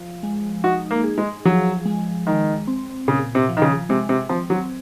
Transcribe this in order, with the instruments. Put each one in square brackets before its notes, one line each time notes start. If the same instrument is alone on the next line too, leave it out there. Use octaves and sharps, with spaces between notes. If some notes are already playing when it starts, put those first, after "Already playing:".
Already playing: [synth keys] F3
G#3
[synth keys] D#4 [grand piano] F#4
[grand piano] A#3
[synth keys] G#4
[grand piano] G#3
[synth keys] F3 [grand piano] F#3
[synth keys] G#3
[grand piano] D#3 [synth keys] G#3
[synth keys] C4
[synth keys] A#2 [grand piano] C#3
[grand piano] C3
[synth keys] F3
[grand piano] D#3
C#3
[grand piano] C3 [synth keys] G#3
[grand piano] C3
[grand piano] F3 [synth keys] C4
[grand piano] F#3